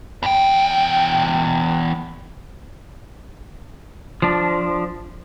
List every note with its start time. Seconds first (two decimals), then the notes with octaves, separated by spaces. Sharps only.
0.23 E2 G5
4.22 F3 D4